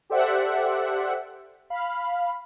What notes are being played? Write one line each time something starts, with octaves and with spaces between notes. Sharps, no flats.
G4 A4 C5 D5 E5 F#5
F5 B5